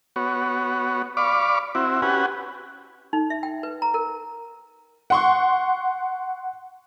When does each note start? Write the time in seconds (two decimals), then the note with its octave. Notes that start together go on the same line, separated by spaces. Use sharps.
0.16 B3 F#4 C#5
1.17 D5 F5 B5 C#6 D6
1.75 C4 E4 F#4
2.02 C#4 F#4 G4 B4 F#5 G#5
3.13 D#4
3.30 E5
3.43 G5
3.63 B4
3.82 A#5
3.94 A#4
5.10 F#5 C6 C#6